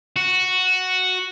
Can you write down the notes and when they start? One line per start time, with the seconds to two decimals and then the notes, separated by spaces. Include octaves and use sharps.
0.16 F#4